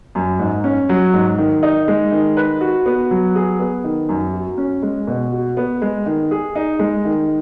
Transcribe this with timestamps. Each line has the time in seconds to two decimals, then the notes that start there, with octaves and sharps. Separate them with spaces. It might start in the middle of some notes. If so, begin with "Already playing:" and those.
0.15 F#2
0.39 G#2
0.64 C#4
0.89 F#3
1.13 G#2
1.38 D#3
1.63 D#4
1.88 G#3
2.12 D#3
2.37 B4
2.61 F#4
2.86 B3
3.11 F#3
3.35 G#4
3.60 B3
3.84 D#3
4.09 F#2
4.33 F#4
4.58 C#4
4.82 G#3
5.07 B2
5.32 F#4
5.57 B3
5.82 G#3
6.06 D#3
6.31 G#4
6.55 D#4
6.79 G#3
7.05 D#3